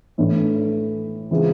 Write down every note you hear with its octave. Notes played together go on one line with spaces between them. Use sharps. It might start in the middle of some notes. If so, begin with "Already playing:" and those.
A2 E3 A3 D4
C#3 E3 G#3 C4 F4